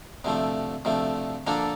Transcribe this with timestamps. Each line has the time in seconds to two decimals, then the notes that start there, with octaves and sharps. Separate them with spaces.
0.24 D2 C3 F3 A3
0.85 D2 C3 F3 A3
1.47 D3 F3 A#3 D4 A4